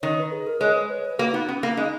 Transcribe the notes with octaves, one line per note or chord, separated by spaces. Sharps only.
D#3 C#5
B4
G#4
A#4
G#3 C#5
B4
C#5
B4
A#3 F#4
B3 D#4
B3 C#4
A#3 C#4
G#3 D#4